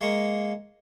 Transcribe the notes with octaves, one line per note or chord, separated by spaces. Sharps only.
G#3 A#3 C#6